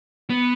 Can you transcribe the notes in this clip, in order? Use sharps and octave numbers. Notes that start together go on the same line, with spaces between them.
B3